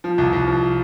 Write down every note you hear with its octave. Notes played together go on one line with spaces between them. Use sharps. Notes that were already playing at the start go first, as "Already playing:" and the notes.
F3
C2
C2
F3